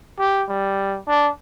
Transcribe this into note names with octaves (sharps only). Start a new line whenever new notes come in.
G4
G3
D4